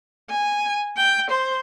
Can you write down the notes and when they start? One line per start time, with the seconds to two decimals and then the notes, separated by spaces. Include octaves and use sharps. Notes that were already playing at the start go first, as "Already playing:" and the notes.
0.30 G#5
0.97 G5
1.31 C5